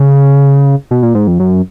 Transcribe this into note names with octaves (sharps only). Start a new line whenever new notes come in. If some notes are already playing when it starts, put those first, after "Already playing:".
Already playing: C#3
B2
A#2
G#2
F2
F#2